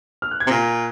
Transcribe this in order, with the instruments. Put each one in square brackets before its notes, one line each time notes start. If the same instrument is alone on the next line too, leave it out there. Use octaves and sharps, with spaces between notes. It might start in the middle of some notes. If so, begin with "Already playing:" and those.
[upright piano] F6
F#6
G#6
[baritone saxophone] C3
[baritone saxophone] A#2 [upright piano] A#6